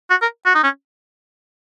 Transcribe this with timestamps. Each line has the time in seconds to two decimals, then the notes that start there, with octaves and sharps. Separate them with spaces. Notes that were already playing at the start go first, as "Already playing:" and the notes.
0.10 F#4
0.22 A#4
0.46 F#4
0.55 D#4
0.63 C#4